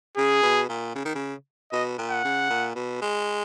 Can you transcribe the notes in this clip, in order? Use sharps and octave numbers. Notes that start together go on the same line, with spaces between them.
C#3 G#4
B2
A#2
C#3
D#3
C#3
B2 D#5
A#2
F#5
C#3
A#2
B2
G#3